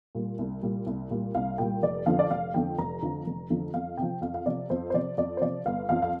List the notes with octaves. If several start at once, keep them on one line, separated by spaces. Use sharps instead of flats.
A#2 G3
C2
A#2 G3
C2
A#2 G3
C2 F5
A#2 G3 G5
F1 D5
F2 D3 F3 F5
D5
F1 F5
F2 D3 F3 G5
F1 A#5
F2 D3 F3
F1
F2 D3 F3
F2 F5
C3 F3 G5
F2 F5
F5
C3 F3 D5
F2 C5
C5
C3 F3 D5
F2 D5
C5
C3 F3 D5
G1 F5
F2 F3 F5
F5